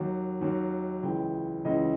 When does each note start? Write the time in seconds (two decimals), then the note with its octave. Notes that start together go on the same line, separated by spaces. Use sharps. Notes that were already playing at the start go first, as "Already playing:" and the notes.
Already playing: D#2 D#3 F#3
0.41 D#2 D#3 F#3
1.03 C#2 C#3 E3 G5
1.65 C#2 C#3 E3 D#5